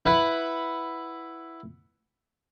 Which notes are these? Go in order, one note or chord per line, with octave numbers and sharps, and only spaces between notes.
E4 B4 F#5